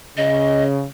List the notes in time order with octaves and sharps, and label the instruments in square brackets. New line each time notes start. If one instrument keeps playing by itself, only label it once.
[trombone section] C#3 [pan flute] D#5